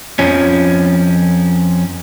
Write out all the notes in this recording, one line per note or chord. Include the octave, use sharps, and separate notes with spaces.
F2 F3 C#4